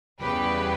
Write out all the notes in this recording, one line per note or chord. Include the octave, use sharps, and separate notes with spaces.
E2 C#3 G3 G4 B4